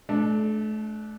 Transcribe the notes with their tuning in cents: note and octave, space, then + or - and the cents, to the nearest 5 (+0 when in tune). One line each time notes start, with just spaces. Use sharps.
A3 -35 D4 +0